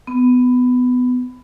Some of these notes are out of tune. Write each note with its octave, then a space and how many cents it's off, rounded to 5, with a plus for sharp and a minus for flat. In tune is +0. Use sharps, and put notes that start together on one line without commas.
B3 +15